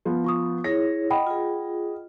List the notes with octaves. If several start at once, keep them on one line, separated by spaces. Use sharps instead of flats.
F3 B3
F4 C#6 D#6
E4 G#4 C#5 A#6
D#5 F#5 G5 B5
F4 G#4